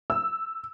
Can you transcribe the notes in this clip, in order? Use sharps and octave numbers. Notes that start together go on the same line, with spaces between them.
E6